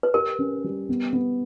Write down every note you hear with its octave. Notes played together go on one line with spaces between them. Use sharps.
B4
G4 A#4
C#4
G3
B3
B3